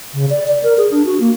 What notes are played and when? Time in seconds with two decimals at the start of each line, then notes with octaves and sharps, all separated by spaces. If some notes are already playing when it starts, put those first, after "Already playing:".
0.14 C#3
0.30 D5
0.48 D5
0.64 A#4
0.78 G#4
0.91 D4
1.06 F#4
1.20 A#3